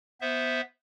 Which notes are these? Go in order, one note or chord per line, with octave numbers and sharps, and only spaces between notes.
B3 C5 E5